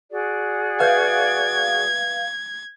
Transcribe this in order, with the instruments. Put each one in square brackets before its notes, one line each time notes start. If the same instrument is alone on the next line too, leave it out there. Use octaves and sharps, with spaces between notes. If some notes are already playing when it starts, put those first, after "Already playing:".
[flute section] F#4 G#4 D5
[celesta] B4 E5 G6 [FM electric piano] F5 [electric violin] G#6